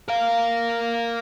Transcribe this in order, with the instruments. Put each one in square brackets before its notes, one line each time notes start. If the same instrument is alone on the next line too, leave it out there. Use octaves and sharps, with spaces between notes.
[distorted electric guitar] A#4 F5